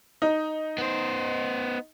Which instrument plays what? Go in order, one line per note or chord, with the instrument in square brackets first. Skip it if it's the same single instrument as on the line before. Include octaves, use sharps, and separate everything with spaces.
[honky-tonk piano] D#4
[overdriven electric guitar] B3 C5